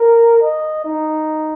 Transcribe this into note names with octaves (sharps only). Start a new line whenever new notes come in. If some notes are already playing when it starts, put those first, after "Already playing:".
Already playing: A#4
D#5
D#4